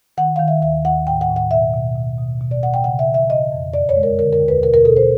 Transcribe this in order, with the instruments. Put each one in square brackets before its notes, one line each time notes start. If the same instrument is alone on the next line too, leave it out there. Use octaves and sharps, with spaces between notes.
[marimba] D#3 F#5
D#3 F5
E5
D#2 E5
D#2 F#5
A2 G5
F#5
A2
F#5
B2 E5
B2
B2
B2
B2
D5
B2 F#5
G5
C#3 F#5
E5
E3
E5
C#3 D#5
F2
F#2 D5
C#5
G#3
A#4
D3 A#4
A#4
D#2
B4
B2 A#4
A#4
B2 A4
C5